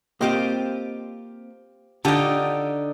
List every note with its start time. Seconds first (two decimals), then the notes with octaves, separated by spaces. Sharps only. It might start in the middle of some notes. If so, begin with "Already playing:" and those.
0.21 A#3 C4 F4 G4 C5 D#5
2.05 D3 D#4 F4 G4 A5